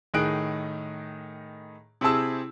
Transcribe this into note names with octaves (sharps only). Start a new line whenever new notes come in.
A2 D#3 D#4 G#4 F#6 D7
C3 C4 E4 G#4 A5 E6